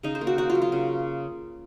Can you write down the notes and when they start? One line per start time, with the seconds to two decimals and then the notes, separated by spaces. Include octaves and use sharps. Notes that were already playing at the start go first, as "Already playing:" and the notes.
0.03 C#3 D#4
0.15 C5
0.21 A#3
0.27 F#4
0.38 A#3 F#4
0.50 F4
0.55 F#3
0.62 F4
0.72 C#3